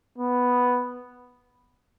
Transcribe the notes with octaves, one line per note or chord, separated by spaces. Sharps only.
B3